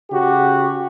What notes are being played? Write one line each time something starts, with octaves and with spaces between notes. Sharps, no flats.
C#3 F#4 G4